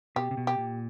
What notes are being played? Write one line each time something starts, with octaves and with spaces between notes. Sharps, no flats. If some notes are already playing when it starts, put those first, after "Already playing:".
B2 G4
C3
B2
G4
A#2